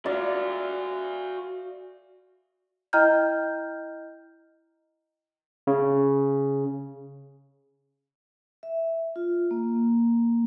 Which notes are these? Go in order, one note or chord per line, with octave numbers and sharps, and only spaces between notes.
F#4 D5 E5 F5
E4 D#5 G5 A#5 F6 G6
C#3
E5
F4
A#3